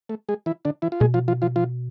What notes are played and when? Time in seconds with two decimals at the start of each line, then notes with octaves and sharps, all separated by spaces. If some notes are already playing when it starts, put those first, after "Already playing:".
0.09 A3
0.29 G#3 G#4
0.46 E3 E4
0.65 D3 D4
0.82 E3 E4
0.92 F4
1.00 B2 G#3 G#4
1.14 F3 F4
1.28 F3 F4
1.42 F3 F4
1.56 F3 F4